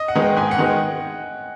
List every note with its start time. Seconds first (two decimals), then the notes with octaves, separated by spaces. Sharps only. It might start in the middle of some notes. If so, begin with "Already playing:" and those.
Already playing: D#5
0.08 F#5
0.15 D#3 G#3 B3 D#4
0.22 G5
0.36 G#2 G#5
0.51 F#5
0.58 D#3 G#3 B3 D#4
0.66 G5